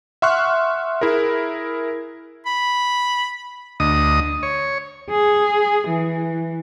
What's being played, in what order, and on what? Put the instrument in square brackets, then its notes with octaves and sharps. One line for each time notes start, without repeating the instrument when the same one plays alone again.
[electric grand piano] E5 F#5 C6 C#6 F6 F#6
E4 G#4 A#4
[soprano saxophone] B5
[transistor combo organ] D2 D#5 D#6
C#5
[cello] G#4
E3